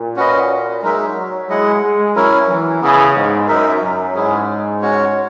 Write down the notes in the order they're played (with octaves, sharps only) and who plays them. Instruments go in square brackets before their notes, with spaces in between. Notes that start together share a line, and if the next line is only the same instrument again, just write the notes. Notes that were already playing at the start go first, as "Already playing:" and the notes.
Already playing: [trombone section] A#2
[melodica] C#4 F#4 B4 D#5
[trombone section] F#3 [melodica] G#3 D#4 A#4 E5
[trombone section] G#3 [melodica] E4 G#4 D#5 F#5
[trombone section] G#3
[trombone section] F#3 [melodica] C#4 E4 A#4
[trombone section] E3
[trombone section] C#3 [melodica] B3 E4 G#4
[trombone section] G#2
[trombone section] F#2 [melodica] D#4 A#4 E5
[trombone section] F#2
[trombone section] G#2 [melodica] C#4 E4 G#4
[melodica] G#3 C#4 F#4 C#5